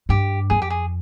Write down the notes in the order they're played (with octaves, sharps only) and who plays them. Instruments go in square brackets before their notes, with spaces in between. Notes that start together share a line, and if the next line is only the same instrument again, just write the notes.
[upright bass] G2 [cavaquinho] G4
[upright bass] F2 [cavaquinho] G#4
[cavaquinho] G4
G#4